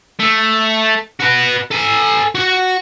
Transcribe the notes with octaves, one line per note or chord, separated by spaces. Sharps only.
A3
F#4 B4
A4 G#5
F#4 F#5